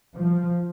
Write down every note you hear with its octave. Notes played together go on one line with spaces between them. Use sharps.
F3